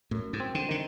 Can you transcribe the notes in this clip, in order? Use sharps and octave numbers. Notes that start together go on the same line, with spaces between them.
F#2 A2
G#2
C4
D3
D3 D#3